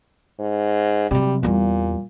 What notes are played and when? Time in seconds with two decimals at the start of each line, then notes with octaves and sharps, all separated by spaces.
0.39 G#2
1.11 C3 F#3 G3
1.43 E2 A#2 G3